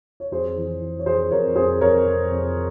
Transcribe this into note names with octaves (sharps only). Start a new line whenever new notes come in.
C#5
F2 G#4 C5
E3
E3
C#5
F2 G#4 C5
F2 A#4 C#5
F2 G#4 C5
F2 A#4 C#5
F2
F2